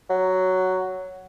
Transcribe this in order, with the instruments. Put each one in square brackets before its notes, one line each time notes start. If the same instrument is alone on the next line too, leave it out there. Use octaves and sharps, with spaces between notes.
[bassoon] F#3